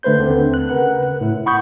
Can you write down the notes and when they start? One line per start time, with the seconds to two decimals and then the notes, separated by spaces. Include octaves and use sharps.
0.03 D3 A3 B4 C5 G6
0.18 D#2 D3 C4
0.54 F#6
0.69 C#3 A#4 B4 F#5 F#6
1.21 A2 E4
1.46 F#5 B5 C#6 D#6 G6